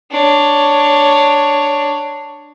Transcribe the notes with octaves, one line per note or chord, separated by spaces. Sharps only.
D4 C#5